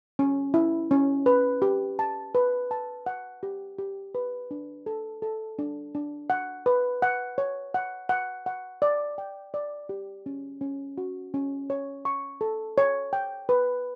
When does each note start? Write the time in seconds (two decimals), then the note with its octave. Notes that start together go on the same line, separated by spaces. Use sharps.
0.19 C#4
0.54 E4
0.91 C#4
1.26 B4
1.62 G4
1.99 A5
2.35 B4
2.71 A5
3.06 F#5
3.43 G4
3.78 G4
4.15 B4
4.51 D4
4.86 A4
5.22 A4
5.59 D4
5.95 D4
6.30 F#5
6.66 B4
7.02 F#5
7.38 C#5
7.74 F#5
8.09 F#5
8.46 F#5
8.82 D5
9.18 G5
9.54 D5
9.89 G4
10.26 C#4
10.61 C#4
10.98 F#4
11.34 C#4
11.70 C#5
12.05 C#6
12.41 A4
12.78 C#5
13.13 G5
13.49 B4